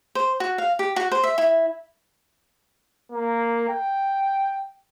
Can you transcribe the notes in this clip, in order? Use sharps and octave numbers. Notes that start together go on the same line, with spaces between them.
C5
F#4
F5
G4
F#4
C5
E5
E4
A#3
G5